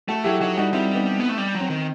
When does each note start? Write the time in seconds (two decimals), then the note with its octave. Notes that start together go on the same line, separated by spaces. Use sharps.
0.08 A3 F#4 A4
0.24 F#3 E4 G4
0.40 F#3 D#4 F#4
0.57 G3 D#4 F#4
0.73 G3 C4 E4
0.95 B3 D#4
1.20 B3
1.29 A3
1.38 G3
1.55 F#3
1.60 C4
1.70 D#3